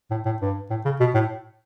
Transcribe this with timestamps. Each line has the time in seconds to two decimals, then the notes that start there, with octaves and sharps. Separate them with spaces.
0.11 A2
0.25 A2
0.41 G2
0.70 A2
0.85 C#3
1.00 B2
1.15 A2